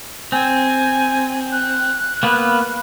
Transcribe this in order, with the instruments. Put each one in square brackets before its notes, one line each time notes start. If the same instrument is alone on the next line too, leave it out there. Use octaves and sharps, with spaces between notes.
[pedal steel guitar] C4 [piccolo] G#5
[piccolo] F#6
[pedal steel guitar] A#3 B3 B4